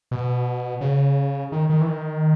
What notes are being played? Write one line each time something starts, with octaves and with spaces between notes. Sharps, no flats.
B2
C#3
D#3
D#3
E3
D#3